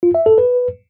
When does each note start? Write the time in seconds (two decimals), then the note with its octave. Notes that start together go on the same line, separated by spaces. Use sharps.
0.03 F4
0.15 E5
0.26 A4
0.38 B4